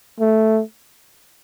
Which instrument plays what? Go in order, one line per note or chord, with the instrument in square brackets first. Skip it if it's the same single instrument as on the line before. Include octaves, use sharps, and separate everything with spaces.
[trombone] A3